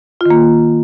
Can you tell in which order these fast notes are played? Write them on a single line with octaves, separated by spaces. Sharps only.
F4 D#3 A#3